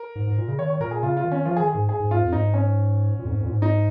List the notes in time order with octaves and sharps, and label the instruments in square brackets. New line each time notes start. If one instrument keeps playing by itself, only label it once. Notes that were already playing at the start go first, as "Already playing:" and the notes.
Already playing: [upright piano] A#4
[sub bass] G#2
G#2
A#2
C#3
[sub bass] D#3 [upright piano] C#5
[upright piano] C#5
[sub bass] A#2 [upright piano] A#4
[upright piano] G#4
[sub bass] C#3 [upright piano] F4
[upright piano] F4
[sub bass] D#3
[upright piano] C#4
[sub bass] F3 [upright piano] F4
[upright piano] G#4
[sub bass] D#3
[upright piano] G#4
[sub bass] G#2
[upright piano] G#4
[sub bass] G#2
[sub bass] G#2 [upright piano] F4
[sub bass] F2
[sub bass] G#2 [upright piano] D#4
[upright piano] C#4
[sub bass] A#2
F2
G#2
F2
A#2
G#2
[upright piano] D#4